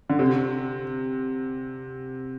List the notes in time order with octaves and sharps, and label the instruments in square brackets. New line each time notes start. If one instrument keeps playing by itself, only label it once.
[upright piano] D3
C3